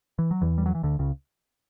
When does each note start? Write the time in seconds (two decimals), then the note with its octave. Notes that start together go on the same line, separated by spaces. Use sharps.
0.19 E3
0.31 F#3
0.42 E2 E3
0.58 G3
0.66 F#3
0.75 E3
0.83 D2 D3
0.99 C#2 C#3